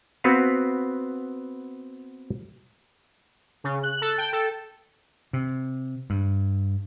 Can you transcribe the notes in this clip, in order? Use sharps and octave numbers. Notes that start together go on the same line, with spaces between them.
B3 C4 F#4 B4 F5
C#3
F#6
A4
G5
A4
C3
G2